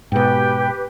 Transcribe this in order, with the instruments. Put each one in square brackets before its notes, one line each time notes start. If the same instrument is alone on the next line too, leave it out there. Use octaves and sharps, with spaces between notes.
[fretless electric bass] G#2 B2 [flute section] G4 B4 [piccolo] G5